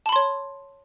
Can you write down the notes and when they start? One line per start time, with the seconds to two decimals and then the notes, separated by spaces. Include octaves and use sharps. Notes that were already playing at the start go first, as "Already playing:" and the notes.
0.06 A5
0.09 B5
0.12 C6
0.16 C#5